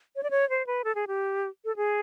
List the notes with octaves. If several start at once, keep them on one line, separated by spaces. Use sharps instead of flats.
C#5
D5
C#5
C5
B4
A4
G#4
G4
A4
G#4